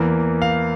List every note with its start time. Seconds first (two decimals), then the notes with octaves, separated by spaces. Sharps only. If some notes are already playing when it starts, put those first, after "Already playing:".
Already playing: E2 E3 A#3
0.42 F5